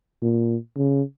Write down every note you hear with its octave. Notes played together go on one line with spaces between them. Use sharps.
A#2
C#3